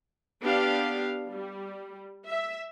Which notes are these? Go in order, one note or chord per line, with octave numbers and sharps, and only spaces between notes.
B3 D4 G4 F5
G3
E5